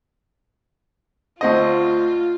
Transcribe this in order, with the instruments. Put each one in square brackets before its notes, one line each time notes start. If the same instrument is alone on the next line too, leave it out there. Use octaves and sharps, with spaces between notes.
[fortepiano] D2 C4 D#5 [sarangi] F4